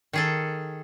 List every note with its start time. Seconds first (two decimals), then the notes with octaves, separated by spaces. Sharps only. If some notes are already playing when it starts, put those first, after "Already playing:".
0.13 D#3 G#4 A4